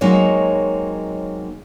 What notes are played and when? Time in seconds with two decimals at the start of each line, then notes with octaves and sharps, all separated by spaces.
0.01 F#3 G#3 A#3 C4 D#4 C#5